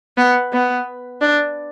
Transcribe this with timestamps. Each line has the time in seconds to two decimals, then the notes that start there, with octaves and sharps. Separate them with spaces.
0.17 B3
0.52 B3
1.21 D4